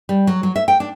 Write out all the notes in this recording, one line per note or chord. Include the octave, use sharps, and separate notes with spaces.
G3
F#3
F#3
E5
G5
D4